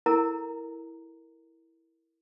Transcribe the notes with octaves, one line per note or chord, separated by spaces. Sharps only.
E4 A4 A#4 A#5